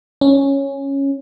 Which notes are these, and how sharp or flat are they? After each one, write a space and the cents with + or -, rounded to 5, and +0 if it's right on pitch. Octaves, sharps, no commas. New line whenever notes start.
C#4 -5